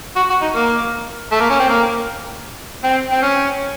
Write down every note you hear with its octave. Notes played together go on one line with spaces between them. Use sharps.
F#4
F#4
D#4
A#3
A3
A#3
C#4
C4
A#3
C4
C4
C#4